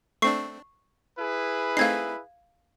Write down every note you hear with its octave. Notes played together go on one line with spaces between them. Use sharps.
A3 C4 D4 C#6 C7
E4 G#4 B4
A3 C4 D#4 F5 G#6 C7